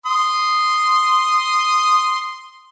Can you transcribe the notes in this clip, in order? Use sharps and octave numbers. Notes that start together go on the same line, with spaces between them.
C6 D#6